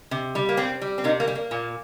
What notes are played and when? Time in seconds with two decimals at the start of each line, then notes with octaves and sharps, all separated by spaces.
0.11 C3
0.35 G3
0.49 A#3
0.57 C3 C4
0.82 G3
0.98 C4
1.04 C3 A#3 D#4
1.20 A#3
1.28 G3
1.35 A#3
1.51 A#2